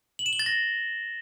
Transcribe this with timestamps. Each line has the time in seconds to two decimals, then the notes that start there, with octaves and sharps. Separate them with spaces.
0.19 F#7
0.26 E7
0.33 G7
0.39 A6
0.46 A#6